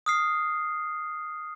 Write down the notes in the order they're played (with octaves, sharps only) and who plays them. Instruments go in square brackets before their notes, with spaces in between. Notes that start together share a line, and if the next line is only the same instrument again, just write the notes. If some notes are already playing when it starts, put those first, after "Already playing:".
[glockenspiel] D#6 F6 C7